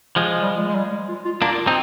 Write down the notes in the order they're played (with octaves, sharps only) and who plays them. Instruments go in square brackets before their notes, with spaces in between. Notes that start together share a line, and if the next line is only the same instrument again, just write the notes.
[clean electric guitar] F3 G#3
[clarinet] G3
G#3
G#3
G3
G#3
F4
F4
[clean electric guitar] A#3 D4
[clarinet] F4
[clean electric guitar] C4 D#4